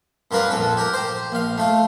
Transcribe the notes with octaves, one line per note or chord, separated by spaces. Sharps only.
F#2 G3 F4 A#4 B4
A#1 F2 A4
G4 A#4
G4 C5
A#1 F5
A3 F4